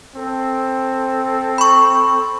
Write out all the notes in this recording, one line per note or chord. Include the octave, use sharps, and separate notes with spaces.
C4 A4
B5 C#6